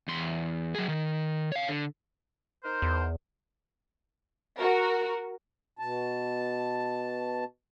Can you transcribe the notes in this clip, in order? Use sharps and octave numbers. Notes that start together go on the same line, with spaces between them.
E2 C6
F#3 G#4
D#3
C#5 F5
D3
D#4 A#4 C5
E2
F#4 A#4
B2 A5